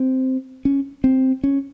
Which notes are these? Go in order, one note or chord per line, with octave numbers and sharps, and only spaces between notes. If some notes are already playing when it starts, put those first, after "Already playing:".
Already playing: C4
C#4
C4
C#4